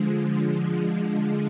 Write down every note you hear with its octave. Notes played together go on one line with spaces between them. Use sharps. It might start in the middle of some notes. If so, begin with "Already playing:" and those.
Already playing: D3 F3 G#3